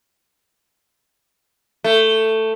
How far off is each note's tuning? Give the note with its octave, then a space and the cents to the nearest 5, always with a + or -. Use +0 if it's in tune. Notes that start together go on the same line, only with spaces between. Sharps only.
A3 +10